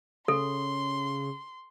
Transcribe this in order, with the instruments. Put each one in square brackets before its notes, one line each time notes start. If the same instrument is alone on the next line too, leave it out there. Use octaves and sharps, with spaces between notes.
[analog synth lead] C#3 [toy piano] A4 [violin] C6